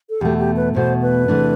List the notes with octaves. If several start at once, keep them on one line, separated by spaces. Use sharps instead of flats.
A4
E2 B2 A3 G4
G4
B4
E2 B2 A3 C5
B4
E2 C3 E3 A3 D4